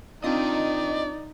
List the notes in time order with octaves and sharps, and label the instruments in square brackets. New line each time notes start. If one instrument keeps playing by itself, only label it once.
[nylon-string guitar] C4 D4 F4 [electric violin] D#4 [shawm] D5 [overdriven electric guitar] D#5 G5